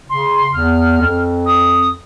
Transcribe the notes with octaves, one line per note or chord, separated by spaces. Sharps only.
C#3 C6
E2 F6
F2
D#6